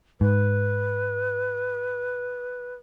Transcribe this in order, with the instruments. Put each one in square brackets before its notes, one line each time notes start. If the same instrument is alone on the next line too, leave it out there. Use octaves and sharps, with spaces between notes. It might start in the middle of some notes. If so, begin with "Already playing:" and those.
[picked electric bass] G#2 [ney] B4